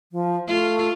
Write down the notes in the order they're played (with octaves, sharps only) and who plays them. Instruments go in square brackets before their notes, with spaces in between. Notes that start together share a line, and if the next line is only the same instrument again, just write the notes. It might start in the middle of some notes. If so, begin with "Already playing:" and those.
[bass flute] F3
[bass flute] A3 [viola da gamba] F4